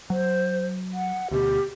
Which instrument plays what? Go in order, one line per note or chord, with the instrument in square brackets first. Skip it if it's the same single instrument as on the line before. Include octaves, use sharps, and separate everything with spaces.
[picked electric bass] F#3 [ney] C5
[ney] F#5
[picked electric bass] D2 B2 [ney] G4